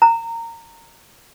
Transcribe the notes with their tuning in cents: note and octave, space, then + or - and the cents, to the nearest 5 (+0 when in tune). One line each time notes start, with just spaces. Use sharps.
A#5 -20